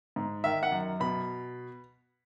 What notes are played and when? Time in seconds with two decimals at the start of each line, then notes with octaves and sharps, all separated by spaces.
0.16 G#2
0.44 D#3 E5
0.63 F#5
0.72 F#2
1.00 B2 B5